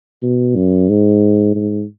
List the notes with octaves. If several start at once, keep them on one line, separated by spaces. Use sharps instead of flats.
B2
F#2
G#2
G#2